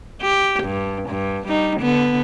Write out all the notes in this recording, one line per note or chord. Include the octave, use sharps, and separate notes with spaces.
G4
G2
G2
G3 D#4
D3 B3